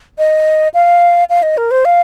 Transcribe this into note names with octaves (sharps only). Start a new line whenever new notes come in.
D#5
F5
F5
D#5
A#4
C5
F5